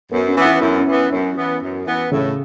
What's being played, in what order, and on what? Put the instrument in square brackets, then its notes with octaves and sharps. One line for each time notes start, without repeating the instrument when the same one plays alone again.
[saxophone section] F#2 [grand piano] B3
[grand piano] C#4
[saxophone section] E3 B3
[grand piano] E4
[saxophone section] F#2 [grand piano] E4
[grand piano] C#4
[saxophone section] E3 B3
[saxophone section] F#2 [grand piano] C#4
[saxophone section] E3 B3
F#2
E3 B3
[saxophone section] A2 [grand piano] C#3